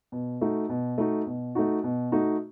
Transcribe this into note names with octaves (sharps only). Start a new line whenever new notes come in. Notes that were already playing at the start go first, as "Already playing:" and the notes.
B2
A3 D#4 F#4
B2
A3 D#4 F#4
B2
A3 D#4 F#4
B2
A3 D#4 F#4